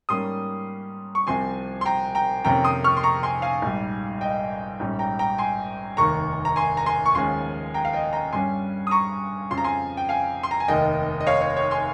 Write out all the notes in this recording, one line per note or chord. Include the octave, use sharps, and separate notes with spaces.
G#2 G3 A#3 C#4 C6 D#6
C#6
C2 C3 F3 C4 G#5 C6
C6
G5 A#5
G5 A#5
F2 C3 D#3 A#3 C#4 G5 A#5
C6 D#6
C#6 F6
C6
A#5 C#6
G#5 C6
F5 G#5
A#1 G#2 G3
D#5 G5
A#1 G#2 G3 C#4
G5 A#5
G5 A#5
G#5 C6
F1 D#2 D#3 A#3 A#5 C#6
A#5
G#5 C6
A#5
G#5 C6
C#6
D#2 C#3 F3 G#3 C#4 G#5 C6
G5 A#5
F5
D#5 G5
G5 A#5
G2 G3 C#4 G#5 C6
D#6
A#5 C#6
F2 C#3 F3 C6
A#5
G#5 C6
G5
F5 G#5
C6
A#5
G#5
F1 D#2 D#3 D#5 G5
D#5
C#5 F5
C#5
C#5
G#5 C6